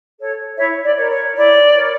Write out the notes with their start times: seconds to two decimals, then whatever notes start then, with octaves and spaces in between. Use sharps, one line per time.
0.18 A4 C#5
0.56 E4 C#5 E5
0.82 D5
0.95 A#4 C#5
1.09 C#5
1.34 E4 D5
1.73 A#4 C#5